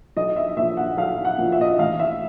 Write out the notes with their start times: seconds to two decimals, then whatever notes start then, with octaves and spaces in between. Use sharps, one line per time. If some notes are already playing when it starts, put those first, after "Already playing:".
0.17 B1 D#5
0.36 E5
0.57 A#2 F3 A#3 E5
0.77 F#5
0.98 B1 F5
1.25 F#5
1.38 A#2 F3 A#3
1.52 E5
1.61 D#5
1.70 E5
1.79 A1 F5
1.99 E5